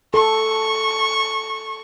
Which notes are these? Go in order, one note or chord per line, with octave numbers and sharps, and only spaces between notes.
A4 C#6